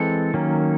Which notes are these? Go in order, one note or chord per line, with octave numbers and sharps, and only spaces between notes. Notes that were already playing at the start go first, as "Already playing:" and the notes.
Already playing: E3 G#3 C4 A4
D#3 F#3 A#3 C#4